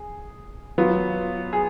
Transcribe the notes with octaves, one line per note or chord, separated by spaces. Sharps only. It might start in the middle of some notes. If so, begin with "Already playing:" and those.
Already playing: G#4
F#3 B3 F4
G#4